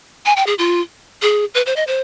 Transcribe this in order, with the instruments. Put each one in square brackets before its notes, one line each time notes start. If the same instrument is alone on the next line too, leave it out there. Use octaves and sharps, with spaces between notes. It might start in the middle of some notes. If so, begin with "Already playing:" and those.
[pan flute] G#5
G5
G#4
F4
G#4
B4
C5
D#5
C5